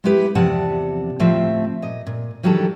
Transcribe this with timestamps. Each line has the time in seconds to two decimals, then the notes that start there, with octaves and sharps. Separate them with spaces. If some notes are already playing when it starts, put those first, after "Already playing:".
0.04 G#3 B3 E4 G4 G#4 B4
0.35 E2 C3 F3 D5 F#5 A5
1.19 D2 A2 F3 A3 C4 E5
1.82 A#2 D#5
2.07 A#2
2.43 D#3 E3 F#3 G3 D4 A4